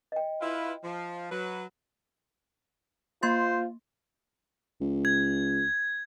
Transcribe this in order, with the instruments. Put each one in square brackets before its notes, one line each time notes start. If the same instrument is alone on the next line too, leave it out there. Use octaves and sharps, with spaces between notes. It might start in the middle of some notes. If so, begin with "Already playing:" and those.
[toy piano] D#5 G5
[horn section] E4 F4 B4
F3
F#3 B4
[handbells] A#3 C6 A6 [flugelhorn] F4 [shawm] C5
[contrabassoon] C#2
[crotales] G#6